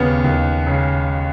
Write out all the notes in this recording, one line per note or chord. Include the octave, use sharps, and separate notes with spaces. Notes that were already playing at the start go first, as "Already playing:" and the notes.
Already playing: D#2 C#3 B3
D#2
C#3